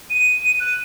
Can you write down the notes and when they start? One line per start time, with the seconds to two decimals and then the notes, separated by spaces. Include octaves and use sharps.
0.10 D#7
0.60 F#6